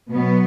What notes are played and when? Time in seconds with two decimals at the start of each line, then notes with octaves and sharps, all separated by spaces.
0.11 B2 F#3 B3